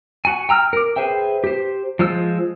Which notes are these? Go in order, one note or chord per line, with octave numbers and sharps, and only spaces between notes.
F#4 G#5
G5 A#5 E6 F6
A#4 D6
G#4 B4 C5 E5 G5
G4 C5
F3 G#3 F4 C5 E6